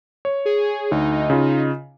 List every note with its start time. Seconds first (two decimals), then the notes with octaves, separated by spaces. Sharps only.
0.25 C#5
0.45 G#4
0.92 D2 D#4
1.30 C#3 F4